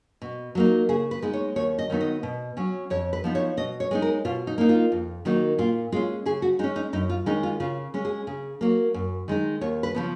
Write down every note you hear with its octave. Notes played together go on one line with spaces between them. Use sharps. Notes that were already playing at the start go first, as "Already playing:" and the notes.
B2
F#3 A#3 D#4
C#3 G#4
B4
G#3 B3 D#4
C#5
D#2 C#5
D#5
D#3 F#3 B3 D#4
D#5
B2
F#3 C#4
F2 C#5
B4
F3 B3 D#4
C#5
B2 D#5
C#5
G#3 B3 D#4
A#4
B2 F4
D#4
A#3 D#4
F4
F2
D#3 F#3 A#3 D#4
A#2 F4
G#3 C#4 F4
C#3 G#4
F#4
G#3 C#4 D#4
D#4
F#2 D#4
F4
D#3 G#3 C#4 D#4
F4
C#3 F4
G#3 C#4
G#4
C#3
F#3 A#3
F#2
D#3 G#3 D#4
D#2 C#5
B4
C#3 F3 B3